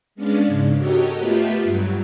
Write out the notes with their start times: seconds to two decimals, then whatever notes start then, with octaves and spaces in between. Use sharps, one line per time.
0.15 G#3 B3 C#4 D4 D5 F5
0.47 G#2 C#3
0.76 F#4 G4 A4 A#4 C#5 D#5
1.18 A3 B3 F4 G4 B4 E5
1.63 G2 F#3